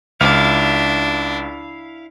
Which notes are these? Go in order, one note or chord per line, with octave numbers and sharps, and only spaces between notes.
C#2 D4 E4 F5 D6